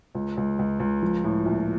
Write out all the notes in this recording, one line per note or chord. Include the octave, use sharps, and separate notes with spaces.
C#2
C#2
C#2
C#2
F3
A2
A#1